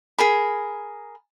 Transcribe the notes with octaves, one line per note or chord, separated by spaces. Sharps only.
G#4 A#4 B5